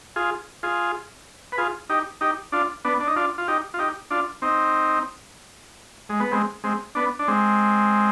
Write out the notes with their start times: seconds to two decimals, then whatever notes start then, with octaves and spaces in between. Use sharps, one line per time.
0.16 F4 G#4
0.63 F4 G#4
1.52 B4
1.58 F4 G#4
1.89 D#4 G4
2.21 D#4 G4
2.52 D4 F4
2.85 B3 D4
3.00 D4
3.07 D#4
3.16 D4 F4
3.38 F4
3.48 D#4 G4
3.74 F4
3.79 D#4 G4
4.11 D4 F4
4.42 C4 D#4
6.09 G#3
6.20 B3
6.32 G#3 C4
6.64 G#3 C4
6.95 B3 D4
7.19 D4
7.28 G#3 C4